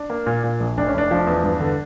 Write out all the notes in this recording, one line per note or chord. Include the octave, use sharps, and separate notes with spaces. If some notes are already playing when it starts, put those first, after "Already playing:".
Already playing: D4
A#3
A#2
A#2
A#1
F1 D4
C#4
F1 D4
F3
E2
G2
D3